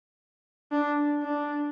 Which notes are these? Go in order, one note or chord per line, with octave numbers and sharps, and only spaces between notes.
D4
D4